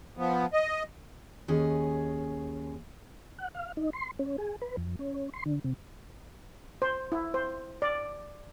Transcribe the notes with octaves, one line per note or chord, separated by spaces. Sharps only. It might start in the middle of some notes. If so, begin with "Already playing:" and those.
F3 B3
D#5
D#2 C#4 G#4 D#5
F#5
F5
D#4
C6
C#4
G#4
B4
F2
C#4
C6
D3
C3
C5
E4
C5
D5